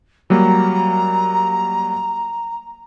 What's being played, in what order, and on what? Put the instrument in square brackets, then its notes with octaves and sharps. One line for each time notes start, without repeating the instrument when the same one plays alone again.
[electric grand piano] F#3 G3 A#3 [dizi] A#5